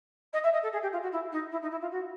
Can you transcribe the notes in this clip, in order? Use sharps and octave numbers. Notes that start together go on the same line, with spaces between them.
D#5
E5
D#5
A4
G#4
G4
F4
F#4
E4
D#4
E4
D#4
E4
F4
F#4